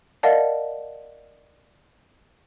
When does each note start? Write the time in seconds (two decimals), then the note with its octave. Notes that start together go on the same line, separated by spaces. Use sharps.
0.23 A#4 D5 D#5 F5 F#5 A5